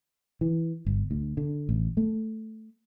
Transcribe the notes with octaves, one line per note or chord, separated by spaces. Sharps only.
E3
G1
D2
D3
A1
A3